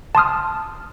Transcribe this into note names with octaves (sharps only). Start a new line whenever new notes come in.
A5 C6 D#6 F6